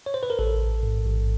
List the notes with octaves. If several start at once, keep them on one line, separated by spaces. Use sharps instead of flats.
C#5
C5
B4
A#4
A1 A4
A1
G#2
A1